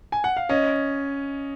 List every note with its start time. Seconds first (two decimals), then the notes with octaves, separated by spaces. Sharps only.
0.12 G#5
0.24 F#5
0.37 F5
0.49 C#4 D#5